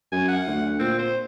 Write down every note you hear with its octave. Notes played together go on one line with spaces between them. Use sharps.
F#2 G#5
F#5
D2
A#2 C4
C5